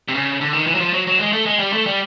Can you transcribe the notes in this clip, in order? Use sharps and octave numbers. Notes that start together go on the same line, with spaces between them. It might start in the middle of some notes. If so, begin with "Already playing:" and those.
C3
C#3
D3
D#3
E3
F#3
F3
F#3
F#3
G#3
A3
G#3
G3
A3
G3